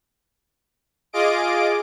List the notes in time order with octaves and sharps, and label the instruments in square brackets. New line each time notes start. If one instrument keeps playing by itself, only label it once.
[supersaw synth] F4 G#4 D#5 D6 D7